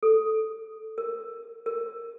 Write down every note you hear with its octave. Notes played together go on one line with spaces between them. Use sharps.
A4
A#4
A#4